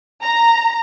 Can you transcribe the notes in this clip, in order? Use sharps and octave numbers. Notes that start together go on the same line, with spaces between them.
A#5